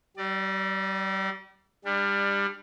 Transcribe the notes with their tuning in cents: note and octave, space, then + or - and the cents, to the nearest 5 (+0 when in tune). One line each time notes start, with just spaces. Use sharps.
G3 -35 D5 +20
G3 +25 D4 +20